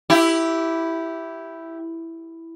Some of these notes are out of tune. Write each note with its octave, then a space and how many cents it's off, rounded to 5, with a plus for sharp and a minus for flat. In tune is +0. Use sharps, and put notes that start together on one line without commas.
E4 +0 G4 -10